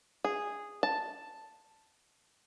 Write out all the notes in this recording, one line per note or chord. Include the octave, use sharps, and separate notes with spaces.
G#4
A5